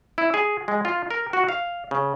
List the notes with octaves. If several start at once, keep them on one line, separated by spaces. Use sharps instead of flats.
E4
G#4
G#3
F4
A#4
F#4
F5
C#3